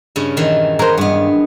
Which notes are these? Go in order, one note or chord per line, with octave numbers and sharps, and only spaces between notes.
G2 C#3 C#4
A#2 D#3 E3
G#4 A#4 C5 C#5 F#5
G2 G#3 B3